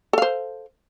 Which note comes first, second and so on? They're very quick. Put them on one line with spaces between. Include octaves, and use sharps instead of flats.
A4 F5 C5